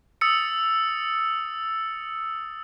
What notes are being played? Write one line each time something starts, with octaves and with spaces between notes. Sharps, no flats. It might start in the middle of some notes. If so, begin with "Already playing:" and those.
D#6 E6 A6 C#7